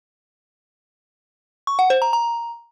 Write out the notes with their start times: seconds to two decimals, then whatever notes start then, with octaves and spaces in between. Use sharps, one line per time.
1.67 C#6
1.79 F#5
1.90 C5
2.02 A#5
2.13 A#5